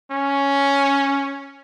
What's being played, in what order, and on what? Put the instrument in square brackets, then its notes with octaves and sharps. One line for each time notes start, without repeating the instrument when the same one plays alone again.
[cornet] C#4